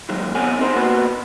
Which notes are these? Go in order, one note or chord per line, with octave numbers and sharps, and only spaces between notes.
A#2 D#3 F#3 G#3
C3 B3 A#4 C#5 F#5 G#5
C4 D#4 A#4 C5
A#3 B3 F#4 B4